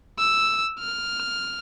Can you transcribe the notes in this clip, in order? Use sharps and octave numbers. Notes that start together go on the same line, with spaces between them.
E6
F6